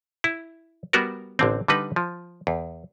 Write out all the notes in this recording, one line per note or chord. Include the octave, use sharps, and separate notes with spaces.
E4
G3 B3 F#4 A#4
A1 D3 C4
D3 G3 D#4 B4
F3
E2